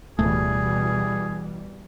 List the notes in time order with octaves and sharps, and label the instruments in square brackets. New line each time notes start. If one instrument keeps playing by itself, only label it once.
[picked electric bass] D1 A3 [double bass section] B2 E3 G3 [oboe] G#4